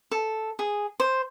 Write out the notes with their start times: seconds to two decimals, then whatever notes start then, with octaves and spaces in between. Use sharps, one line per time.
0.11 A4
0.59 G#4
1.00 C5